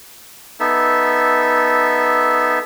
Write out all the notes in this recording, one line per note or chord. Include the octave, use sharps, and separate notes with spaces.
B3 D#4 A4 E5